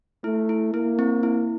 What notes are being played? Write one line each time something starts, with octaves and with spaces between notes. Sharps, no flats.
A3 E4
E4
A#3 E4
C4
E4